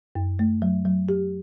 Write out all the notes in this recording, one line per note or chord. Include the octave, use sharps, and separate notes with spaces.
F#2
A3
F#3
F#3
G4